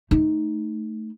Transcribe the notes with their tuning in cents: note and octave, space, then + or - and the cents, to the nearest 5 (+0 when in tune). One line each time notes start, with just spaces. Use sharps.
A3 +0 D#4 +0